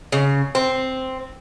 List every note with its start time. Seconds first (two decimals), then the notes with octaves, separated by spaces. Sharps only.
0.12 C#3
0.55 C4